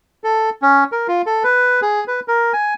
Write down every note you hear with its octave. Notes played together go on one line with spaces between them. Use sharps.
A4
C#4
A#4
F4
A4
B4
G#4
B4
A#4
G#5